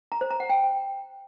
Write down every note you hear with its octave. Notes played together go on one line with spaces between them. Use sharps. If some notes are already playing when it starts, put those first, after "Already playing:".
A#5
C5
A#5
F#5
G5